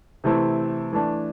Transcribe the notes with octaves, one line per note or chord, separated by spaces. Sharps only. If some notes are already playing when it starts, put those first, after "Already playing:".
C3 E3 A3 C4 E4
E3 A3 D4